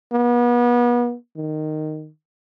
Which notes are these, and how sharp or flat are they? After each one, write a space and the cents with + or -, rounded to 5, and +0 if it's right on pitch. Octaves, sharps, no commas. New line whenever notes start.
B3 -35
D#3 -10